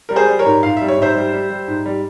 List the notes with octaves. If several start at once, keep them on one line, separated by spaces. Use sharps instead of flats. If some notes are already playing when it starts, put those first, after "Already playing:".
G3 A#4
G#4 C5
G3
A#4 C#5
G#2
G#2 F5
G3 E5
C#5
G#2 C5 E5
G3
G3
G3
G#2
G3